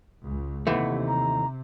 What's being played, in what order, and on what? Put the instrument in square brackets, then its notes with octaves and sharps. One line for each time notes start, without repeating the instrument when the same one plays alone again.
[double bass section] C#2
[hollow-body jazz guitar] D#2 E3 A3 [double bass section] C3 [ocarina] F#5
[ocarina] A#5